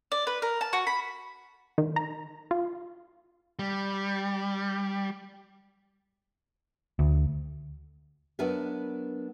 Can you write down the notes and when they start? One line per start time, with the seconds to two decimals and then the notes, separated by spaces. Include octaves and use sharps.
0.12 D5
0.27 B4
0.42 A#4
0.61 A5
0.73 F#4
0.87 B5
1.78 D#3
1.96 A#5
2.51 F4
3.59 G3
6.99 D2
8.39 F#3 B3 D4 A#4 B4 E5